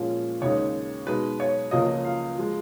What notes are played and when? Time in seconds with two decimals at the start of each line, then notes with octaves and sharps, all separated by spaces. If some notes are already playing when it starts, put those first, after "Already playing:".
Already playing: A#2 F3 G#3 C#4
0.41 D#2 C#3 G#3 D#4 C#5
1.07 B2 G#3 D#4 B4
1.40 C#5
1.71 C#2 C#3 F3 A#3 C#4 D#5
2.05 F5
2.38 F3 G#3